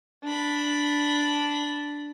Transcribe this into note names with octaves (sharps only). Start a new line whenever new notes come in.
D4 B5